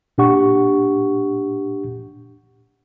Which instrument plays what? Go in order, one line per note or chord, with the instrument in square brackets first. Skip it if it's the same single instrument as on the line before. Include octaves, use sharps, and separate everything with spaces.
[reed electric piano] A#2 D4 G4 F#5 C#6